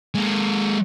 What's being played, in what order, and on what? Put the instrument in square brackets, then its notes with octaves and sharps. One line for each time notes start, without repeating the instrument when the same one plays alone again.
[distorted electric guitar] G#3 A#3